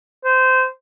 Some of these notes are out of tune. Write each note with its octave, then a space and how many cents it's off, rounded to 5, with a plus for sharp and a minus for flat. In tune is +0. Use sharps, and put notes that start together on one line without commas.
C5 -20